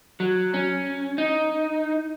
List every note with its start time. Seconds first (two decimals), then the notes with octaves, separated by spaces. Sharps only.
0.20 F#3
0.54 C#4
1.18 D#4